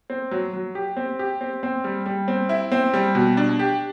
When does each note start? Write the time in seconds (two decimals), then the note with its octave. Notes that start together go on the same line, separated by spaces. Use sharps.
0.10 C4
0.31 F#3
0.53 F#3
0.75 G4
0.97 C4
1.19 G4
1.41 C4
1.63 C4
1.84 G3
2.06 G3
2.28 C4
2.49 E4
2.72 C4
2.94 G3
3.15 B2
3.37 D4
3.59 G4